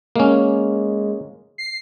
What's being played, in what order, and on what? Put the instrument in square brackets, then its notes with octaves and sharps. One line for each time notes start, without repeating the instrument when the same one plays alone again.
[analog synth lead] G#3 [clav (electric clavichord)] A#3 C#4
[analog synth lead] C7